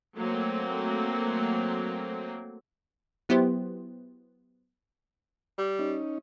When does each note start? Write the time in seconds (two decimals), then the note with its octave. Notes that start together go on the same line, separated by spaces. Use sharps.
0.17 F#3 A3 A#3 C4
3.29 F#3 B3 E4 G4 C5
5.58 G3
5.79 C#4 D#4